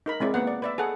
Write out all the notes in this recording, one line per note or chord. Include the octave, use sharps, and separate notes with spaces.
D#4 A#4 B5
G#3 C4 E4 D5
A#3 B3 F#5
D5
B4 D5 E5
G#4 A4 F#5